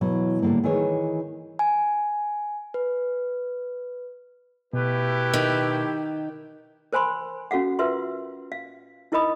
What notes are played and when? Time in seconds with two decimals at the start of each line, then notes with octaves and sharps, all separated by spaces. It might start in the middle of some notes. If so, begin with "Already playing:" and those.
0.01 B2 E3 F#3
0.42 A2 D3 F#3 G3 A#3
0.64 D#3 E3 E4 G#4 B4 C#5
1.59 G#5
2.74 B4
4.73 B2 A3 E4 G4 B4
5.34 D#3
6.93 A#4 C5 G#5 B5 C6
7.51 C#4 F#4 A4 F5 F#5
7.79 F4 A#4 B4 E5 C6
8.52 F5
9.12 D#4 E4 A#4 D#5 B5 D#6